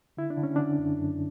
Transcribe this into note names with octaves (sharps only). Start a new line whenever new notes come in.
D3 E4
D4
D3
C#4
D3 D4
F#2
F#2